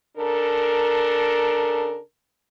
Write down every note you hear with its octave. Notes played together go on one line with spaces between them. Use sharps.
C#3 D4 A4 A#4